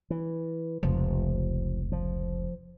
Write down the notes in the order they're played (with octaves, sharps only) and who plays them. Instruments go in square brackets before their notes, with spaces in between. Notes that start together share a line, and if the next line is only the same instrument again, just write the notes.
[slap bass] E3
[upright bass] F1 C#2 [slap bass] F3
[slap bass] F3